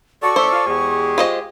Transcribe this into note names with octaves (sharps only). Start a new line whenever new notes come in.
F#4 A4 D5 C#6
A2 C#4 C5 E5
F4
E2 G#3 G4 G#4
F4 C5 D#5